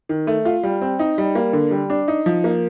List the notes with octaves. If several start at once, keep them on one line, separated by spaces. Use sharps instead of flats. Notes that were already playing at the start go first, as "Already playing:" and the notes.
D#3
A3
F4
G3
C4
D#4
G3
A#3
D3
G3
D4
D#4
F3
A#3